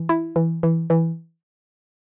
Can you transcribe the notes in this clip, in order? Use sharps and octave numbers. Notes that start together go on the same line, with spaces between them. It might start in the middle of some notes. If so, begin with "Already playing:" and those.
Already playing: E3
E4
E3
E3
E3